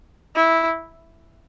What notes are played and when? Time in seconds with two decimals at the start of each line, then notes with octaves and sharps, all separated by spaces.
0.36 E4